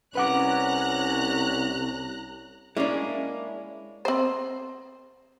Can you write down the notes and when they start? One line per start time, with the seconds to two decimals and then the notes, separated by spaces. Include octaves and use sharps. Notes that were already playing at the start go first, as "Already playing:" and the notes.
0.15 C2 C#4 B4 F#5 A#5 D6 F#6
2.77 G#3 A#3 C#4 D4 E4
4.05 C4 C5